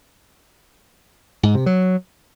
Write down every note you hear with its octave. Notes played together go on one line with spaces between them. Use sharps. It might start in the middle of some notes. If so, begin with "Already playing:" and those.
G#2
C3
F#3